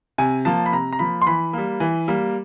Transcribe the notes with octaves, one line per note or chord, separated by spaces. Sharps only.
C3 G#5
F3 A#3 A5
B5
C3 A#5
A#5
F3 A#3 B5
C6
E3 B5
G3 A#3
E3
G3 A#3